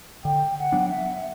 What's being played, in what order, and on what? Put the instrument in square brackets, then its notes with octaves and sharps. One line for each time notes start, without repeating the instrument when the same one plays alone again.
[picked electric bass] D3 [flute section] G5
[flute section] F#5
[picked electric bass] F#3 B3 D4
[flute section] E5